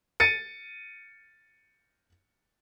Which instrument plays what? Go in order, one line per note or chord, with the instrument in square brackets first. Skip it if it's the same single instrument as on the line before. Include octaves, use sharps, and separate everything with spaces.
[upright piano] A6 C#7 D#7